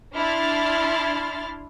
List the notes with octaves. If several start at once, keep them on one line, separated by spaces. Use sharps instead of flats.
D4 E4 C6 F6 A6